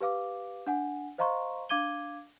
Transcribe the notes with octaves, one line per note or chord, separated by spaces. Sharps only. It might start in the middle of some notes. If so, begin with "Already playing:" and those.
G4 B4 F5 D6
D4 F#5 G#5
C5 D#5 F5 A#5 C6 C#6
D4 F5 D6 G#6 D#7 G7